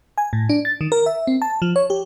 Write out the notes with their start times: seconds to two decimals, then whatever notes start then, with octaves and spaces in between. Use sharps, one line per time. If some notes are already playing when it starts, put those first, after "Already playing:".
0.18 G#5
0.33 A2
0.49 D4
0.65 A6
0.81 D#3
0.92 A#4
1.06 E5
1.27 C4
1.42 A5
1.62 F3
1.76 C#5
1.90 G4